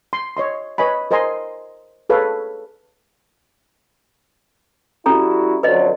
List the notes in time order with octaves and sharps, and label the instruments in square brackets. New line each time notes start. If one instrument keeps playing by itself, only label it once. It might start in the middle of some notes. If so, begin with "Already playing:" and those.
[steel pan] C6
C#5 D#5 C6
B4 C#5 D#5 G#5 B5
A#4 C5 D#5 G#5 A#5 C6
G#4 A4 B4 C#5 F5
[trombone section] G3 E4 F#4 [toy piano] C#4 A4 A#5
[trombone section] F2 D3 F#3 [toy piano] B4 D#5